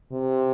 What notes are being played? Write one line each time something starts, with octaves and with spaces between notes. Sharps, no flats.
C3